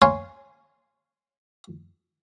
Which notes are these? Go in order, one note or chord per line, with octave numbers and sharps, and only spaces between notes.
C#5 F5 G#5 C6